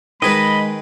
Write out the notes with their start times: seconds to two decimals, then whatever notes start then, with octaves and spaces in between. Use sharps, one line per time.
0.22 D#3 G#3 G#4 B4 D#5 B5